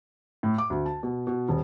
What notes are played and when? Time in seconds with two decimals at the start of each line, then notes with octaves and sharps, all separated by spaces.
0.43 A2
0.58 D6
0.70 D2
0.86 A5
1.03 B2
1.27 B2
1.49 D#1